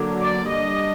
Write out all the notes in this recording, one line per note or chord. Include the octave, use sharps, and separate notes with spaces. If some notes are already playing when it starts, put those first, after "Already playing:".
Already playing: D3 F#3 A#3 D4
D5
G3 D4 D#5